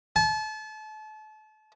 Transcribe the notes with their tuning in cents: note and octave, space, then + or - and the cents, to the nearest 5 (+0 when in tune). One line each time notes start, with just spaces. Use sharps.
A5 -35